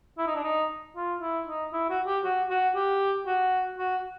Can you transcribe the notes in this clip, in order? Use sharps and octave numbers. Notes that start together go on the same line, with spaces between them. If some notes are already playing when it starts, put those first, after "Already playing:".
E4
D#4
D4
D#4
F4
E4
D#4
E4
F#4
G4
F#4
F#4
G4
F#4
F#4